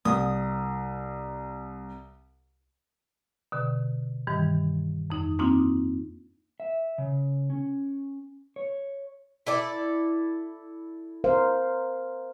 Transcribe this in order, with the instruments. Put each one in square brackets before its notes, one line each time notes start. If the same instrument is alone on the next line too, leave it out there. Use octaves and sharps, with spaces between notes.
[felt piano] C2 [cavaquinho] D#6
[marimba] B2 D3
G2 D#3 E3 G3
F2 D#4
A#3 C4 D4 D#4 F4
[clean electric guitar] E5
C#3
C#4
C#5
[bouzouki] E4 A4 D5
[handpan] A#4 C5 F5